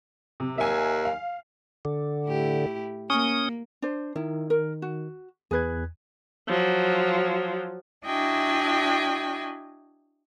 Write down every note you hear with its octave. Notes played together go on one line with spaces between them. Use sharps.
C3
D#2 E5 G#5
F5
D3
A2 E4 G4
A#3 C#4 D#6
D4 C5
D#3 E4
A#4
F#4
E2 G#4 B4 F#6 G#6
F3 F#3
D4 E4 F#4 D#5 G5 G#5